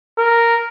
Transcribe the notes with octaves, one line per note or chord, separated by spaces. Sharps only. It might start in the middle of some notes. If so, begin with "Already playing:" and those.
A#4